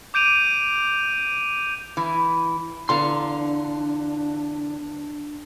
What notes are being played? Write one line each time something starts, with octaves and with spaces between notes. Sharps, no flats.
D6 G6 D7 D#7 F7
E3
E2 D3 D4 F5 A#5 C6